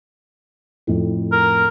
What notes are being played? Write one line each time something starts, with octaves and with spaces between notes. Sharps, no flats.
F2 A2
A#4